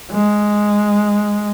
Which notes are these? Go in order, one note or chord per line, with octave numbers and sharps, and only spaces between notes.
G#3